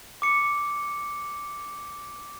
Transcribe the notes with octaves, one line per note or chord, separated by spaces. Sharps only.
D6 C#7